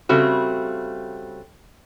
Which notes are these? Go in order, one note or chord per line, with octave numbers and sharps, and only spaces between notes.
C#3 G3 A3 C4 F#4